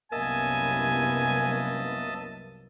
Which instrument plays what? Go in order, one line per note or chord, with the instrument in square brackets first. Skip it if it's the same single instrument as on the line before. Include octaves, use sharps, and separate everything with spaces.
[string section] C2 F#2 B3 [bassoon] A#3 [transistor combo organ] D#5 E5 A5 [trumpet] G#5